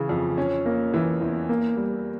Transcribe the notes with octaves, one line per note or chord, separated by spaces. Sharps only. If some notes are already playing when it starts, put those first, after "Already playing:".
Already playing: C#3 E3
F2
C#4
A#3
E3
E2
A#3
G3